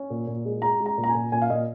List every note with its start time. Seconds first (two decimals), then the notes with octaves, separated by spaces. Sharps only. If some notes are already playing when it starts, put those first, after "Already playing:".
Already playing: C#4
0.10 A#2
0.27 A#2
0.45 G#3
0.62 G#3 A#5
0.80 G#3
0.86 A#5
0.98 A#2
1.04 A#5
1.09 G#5
1.15 A#2
1.32 A#2 G#5
1.42 F5
1.50 A#2 D#5